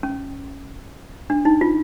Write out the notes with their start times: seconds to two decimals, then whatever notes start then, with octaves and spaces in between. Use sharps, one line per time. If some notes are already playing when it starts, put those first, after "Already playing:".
0.03 C#4
1.30 D4
1.45 D#4
1.61 F4